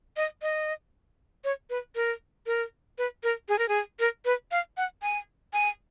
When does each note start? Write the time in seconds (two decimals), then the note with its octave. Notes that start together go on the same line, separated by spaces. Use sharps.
0.17 D#5
0.42 D#5
1.44 C#5
1.70 B4
1.95 A#4
2.46 A#4
2.98 B4
3.23 A#4
3.49 G#4
3.59 A#4
3.69 G#4
4.00 A#4
4.25 B4
4.51 F5
4.77 F#5
5.02 G#5
5.53 G#5